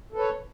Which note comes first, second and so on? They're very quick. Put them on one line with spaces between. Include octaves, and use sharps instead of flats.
A4 B4 C#5